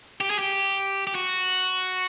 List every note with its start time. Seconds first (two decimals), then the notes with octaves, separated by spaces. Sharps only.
0.21 G4
0.30 G#4
0.39 G4
1.07 G4
1.15 F#4